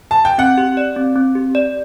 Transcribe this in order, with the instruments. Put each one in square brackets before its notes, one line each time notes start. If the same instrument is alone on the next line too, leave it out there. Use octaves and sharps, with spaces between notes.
[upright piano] A5
G5
[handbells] C4 [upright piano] F#5
[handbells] G4
D5
C4
C4
G4
D5